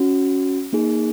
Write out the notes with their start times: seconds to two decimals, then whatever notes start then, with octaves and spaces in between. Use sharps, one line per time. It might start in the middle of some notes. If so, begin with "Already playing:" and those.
Already playing: C#4 F#4
0.73 A#3 D#4 G#4